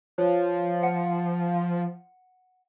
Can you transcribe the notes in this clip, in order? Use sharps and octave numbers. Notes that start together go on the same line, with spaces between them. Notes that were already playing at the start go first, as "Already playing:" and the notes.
F3 C5 C#5
F#5 C#7